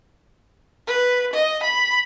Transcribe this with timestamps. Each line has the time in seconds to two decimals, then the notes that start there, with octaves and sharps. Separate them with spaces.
0.87 B4
1.33 D#5
1.63 B5